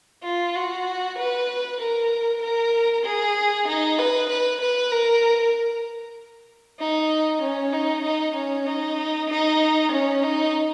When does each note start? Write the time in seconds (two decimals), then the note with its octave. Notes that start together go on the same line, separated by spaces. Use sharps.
0.24 F4
0.55 F#4
1.18 B4
1.80 A#4
2.42 A#4
3.05 G#4
3.67 D#4
3.98 B4
4.29 B4
4.61 B4
4.92 A#4
6.79 D#4
7.42 C#4
7.72 D#4
8.04 D#4
8.36 C#4
8.66 D#4
9.29 D#4
9.91 C#4
10.23 D#4